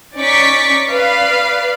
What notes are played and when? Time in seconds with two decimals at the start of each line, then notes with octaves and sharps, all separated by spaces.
0.17 C#4 D#4 D5 C#6 D6 B6
0.90 B4 D5 F5